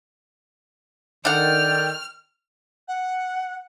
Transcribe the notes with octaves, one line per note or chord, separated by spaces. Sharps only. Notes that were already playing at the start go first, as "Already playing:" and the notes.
D#3 D4 A4 D5 F#5 G5 F6
F#5